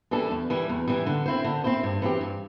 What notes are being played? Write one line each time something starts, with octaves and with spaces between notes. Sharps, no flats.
E3 G3 D4 A4
E2
E3 G3
E2
E3 G3
D3
C4 E4 C5
D3
C4 E4 C5
G2
E3 C4 G4
G2